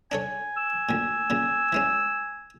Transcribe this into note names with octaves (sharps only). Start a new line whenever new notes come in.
D4 A4 C#5 G#5
E6
D2 A#2
A#2 C#3
E3 G#3 C#4